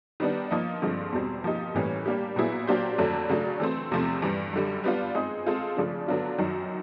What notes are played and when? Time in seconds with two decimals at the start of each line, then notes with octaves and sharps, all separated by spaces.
0.20 D#3 G3 B3 D4
0.50 F3 A#3 D#4
0.82 G2 D3 F3 G#3 C4
1.12 E2 B2 G3 C4
1.44 F3 A#3 D#4 G4
1.75 A2 E3 G3 A#3 C#4
2.05 G3 A#3 D4 G4
2.36 A#2 F#3 B3 E4 G#4
2.67 F#3 A#3 D4 G4 C5
2.98 F2 D3 F#3 A3 D4
3.29 C#3 F#3 A3 D4
3.60 E3 A3 C4
3.91 E2 C3 F3 A3 C4
4.22 G2 E3 G3
4.53 F#2 D3 G3
4.84 G3 B3 D4 F4
5.15 G#3 C4 D#4 G#4
5.46 G#3 C4 F4 A4
5.77 C#3 F3 A3 D4
6.08 D3 F#3 B3 D4 F4
6.38 F#2 D#3 F#3